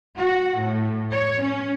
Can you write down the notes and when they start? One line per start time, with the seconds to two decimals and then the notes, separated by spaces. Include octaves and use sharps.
0.17 F#4
0.59 A2
1.11 C#5
1.42 C#4